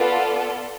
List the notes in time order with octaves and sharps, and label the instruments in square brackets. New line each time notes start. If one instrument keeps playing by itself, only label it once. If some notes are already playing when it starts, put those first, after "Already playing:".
Already playing: [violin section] B3 F4 A4 D5 [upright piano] B4